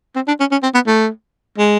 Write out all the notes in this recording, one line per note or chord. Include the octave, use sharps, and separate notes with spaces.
C4
D4
C#4
C#4
C4
B3
A3
G#3